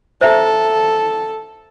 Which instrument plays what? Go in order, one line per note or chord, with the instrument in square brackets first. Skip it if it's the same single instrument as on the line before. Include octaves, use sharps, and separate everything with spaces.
[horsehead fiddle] A4 [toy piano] C5 E5 A#5